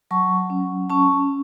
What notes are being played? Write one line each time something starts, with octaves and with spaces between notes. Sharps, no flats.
F#3 A5 C#6
C#4
C#4 A5 C#6